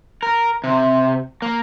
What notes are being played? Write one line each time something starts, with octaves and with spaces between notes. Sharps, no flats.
A#4
C3
A#3